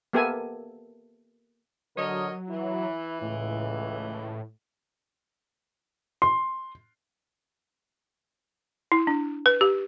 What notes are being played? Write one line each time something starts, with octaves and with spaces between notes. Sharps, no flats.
A#3 B3 G4 A4 E5 G#5
D3 F#3 A#4 C#5 D#5
E3 E4
C#2 A2
C6
E4
D4
B4
G4